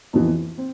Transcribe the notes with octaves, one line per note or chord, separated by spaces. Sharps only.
F2 E3 B3
C4